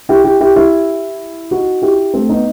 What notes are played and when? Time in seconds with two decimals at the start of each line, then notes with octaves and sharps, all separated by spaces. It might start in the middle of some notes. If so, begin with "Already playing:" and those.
0.09 E4 G4
0.24 E4 G4
0.40 E4 G4
0.56 E4 G4
1.51 D#4 F#4
1.82 E4 G4
2.14 A3 C4
2.29 B3 D#4